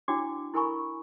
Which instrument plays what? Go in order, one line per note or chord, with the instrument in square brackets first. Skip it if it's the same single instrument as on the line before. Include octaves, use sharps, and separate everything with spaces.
[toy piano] D4 E4 F#4 C#5 G5 D6
E4 A4 A#4 G#5 B5 C#6